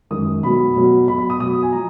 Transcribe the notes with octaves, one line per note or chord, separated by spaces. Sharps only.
F#2 D#3 G#3 D#6
B2 F#3 B5
B2 F#3
B2 F#3 B5
B5
D#6
B2 F#3 D#6
G#5
F3 A#5